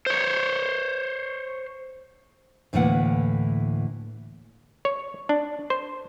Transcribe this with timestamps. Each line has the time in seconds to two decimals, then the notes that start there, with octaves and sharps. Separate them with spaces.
0.06 C5 C#5
2.73 D2 A2 D3 E3 A#3 F#5
4.85 C#5
5.29 D4
5.70 C5